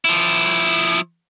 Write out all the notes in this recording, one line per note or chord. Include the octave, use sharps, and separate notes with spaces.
F3 E4